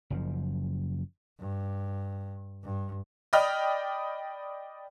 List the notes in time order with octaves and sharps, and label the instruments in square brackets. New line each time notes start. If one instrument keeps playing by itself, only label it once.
[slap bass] F#1 F#2 F3
[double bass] G2
G2
[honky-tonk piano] D5 D#5 G5 B5 D#6 F6